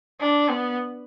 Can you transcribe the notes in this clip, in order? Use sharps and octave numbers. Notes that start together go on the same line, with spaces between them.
D4
B3